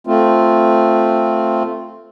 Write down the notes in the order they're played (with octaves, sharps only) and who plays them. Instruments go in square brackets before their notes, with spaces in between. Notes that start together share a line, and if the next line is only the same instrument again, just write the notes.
[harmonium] A3 C4 F4